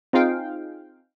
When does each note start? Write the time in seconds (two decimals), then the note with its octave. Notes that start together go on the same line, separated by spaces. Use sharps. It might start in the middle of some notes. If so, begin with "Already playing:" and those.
0.13 C4 D#4 F4 G#4 F5 G5